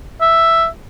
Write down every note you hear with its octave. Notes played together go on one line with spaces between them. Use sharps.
E5